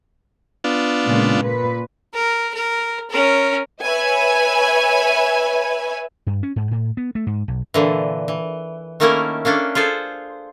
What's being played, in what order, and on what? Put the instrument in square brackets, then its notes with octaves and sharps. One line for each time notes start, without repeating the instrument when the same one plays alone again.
[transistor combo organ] B3 D4 F4
[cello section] A#2 C#3 G#3
A#2 B4
[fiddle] A#4
A#4
C#4 A#4
[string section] B4 C#5 E5 G#5
[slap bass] G2
C#4
G#2
A2
B3
A3
G#2
B1
[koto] A#2 D3 E3
E3
D#3 A3 A#3 C#4 E4 A#4
A#3 C#4 D4 A4
F4 G#4 A4 C5